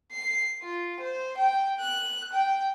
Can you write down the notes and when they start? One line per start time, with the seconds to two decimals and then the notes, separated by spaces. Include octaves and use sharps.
0.12 C7
0.63 F4
1.00 C5
1.37 G5
1.80 F#6
2.33 G5